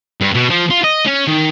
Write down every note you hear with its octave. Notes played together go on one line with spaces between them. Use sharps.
G2
B2
F3
F4
D#5
C#4
D#3